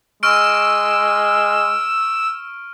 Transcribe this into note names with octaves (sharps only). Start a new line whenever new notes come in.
G#3 C#6 E6 F6 D7